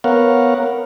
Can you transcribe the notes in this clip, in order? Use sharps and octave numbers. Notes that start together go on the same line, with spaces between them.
B3 A#4 C#5 F5 F#5